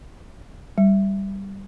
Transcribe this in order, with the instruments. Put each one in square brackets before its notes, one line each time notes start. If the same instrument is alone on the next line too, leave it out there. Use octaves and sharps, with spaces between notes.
[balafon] G3